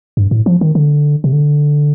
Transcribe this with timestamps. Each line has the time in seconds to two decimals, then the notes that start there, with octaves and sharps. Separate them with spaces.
0.17 G2
0.31 A2
0.46 F3
0.61 D#3
0.75 D3
1.24 C3
1.33 D3